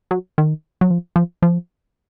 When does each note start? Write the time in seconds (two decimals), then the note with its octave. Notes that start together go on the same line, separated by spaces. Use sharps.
0.11 F#3
0.38 D#3
0.81 F#3
0.90 F3
1.16 F3
1.42 F3